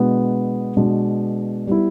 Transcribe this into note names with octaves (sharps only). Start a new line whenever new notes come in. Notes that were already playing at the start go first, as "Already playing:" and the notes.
Already playing: B2 G#3 B3 D4
B2 G#3 B3 D4
G3 B3 E4